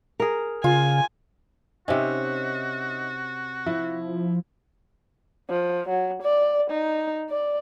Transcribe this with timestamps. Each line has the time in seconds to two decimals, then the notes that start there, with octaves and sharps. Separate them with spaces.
0.20 G#4 A#4
0.64 C#3 F4 G#5
1.88 C3 C#4 D#4 F#4 C5 E5
3.66 F3 E4
5.50 F3
5.89 F#3
6.23 D5
6.70 D#4
7.30 D5